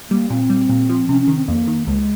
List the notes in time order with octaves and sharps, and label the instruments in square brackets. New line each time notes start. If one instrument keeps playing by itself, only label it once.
[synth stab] G3 [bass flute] A#3
[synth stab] A#2 [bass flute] C4
[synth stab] G3
A#2
F3
[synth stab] C3 [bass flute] C#4
[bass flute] C#4
[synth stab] D#3
[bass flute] C4
[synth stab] F2 [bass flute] A#3
[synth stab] D#3
[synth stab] C#2 [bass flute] G#3